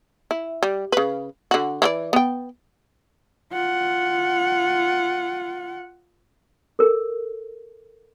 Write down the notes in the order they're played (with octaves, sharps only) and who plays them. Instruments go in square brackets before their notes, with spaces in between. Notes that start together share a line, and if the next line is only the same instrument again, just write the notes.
[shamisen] E4
G3
C#3 B4
D3 F#4
E3 F#4 D5
B3 G5
[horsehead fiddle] F4 F#5
[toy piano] A4 A#4